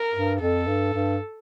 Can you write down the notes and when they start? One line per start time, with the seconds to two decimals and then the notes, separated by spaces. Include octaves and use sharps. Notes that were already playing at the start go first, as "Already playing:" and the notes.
Already playing: A#4
0.14 G2
0.41 F2 A4
0.67 G2
0.94 G2